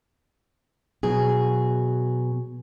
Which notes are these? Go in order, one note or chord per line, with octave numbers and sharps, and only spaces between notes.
B2 F#3 G#4